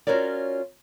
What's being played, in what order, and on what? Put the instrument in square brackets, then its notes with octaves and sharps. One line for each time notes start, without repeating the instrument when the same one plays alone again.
[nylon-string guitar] C#4 F4 F#4 A#4 C#5 D5